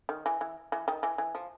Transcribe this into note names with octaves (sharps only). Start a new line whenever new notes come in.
D#3
E3
E3
E3
D#3
E3
E3
F3